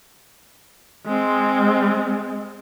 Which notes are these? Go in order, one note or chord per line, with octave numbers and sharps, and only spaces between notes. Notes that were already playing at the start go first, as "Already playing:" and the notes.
G#3 C4